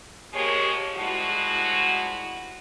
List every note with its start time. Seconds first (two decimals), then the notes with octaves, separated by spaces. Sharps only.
0.33 F3 G#3 A#3 G4 G#4 C#5
0.96 F3 G3 G#3 E4 F#4